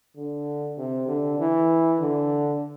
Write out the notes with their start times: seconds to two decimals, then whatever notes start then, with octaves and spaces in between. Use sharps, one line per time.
0.16 D3
0.77 C3
1.08 D3
1.39 E3
2.00 D3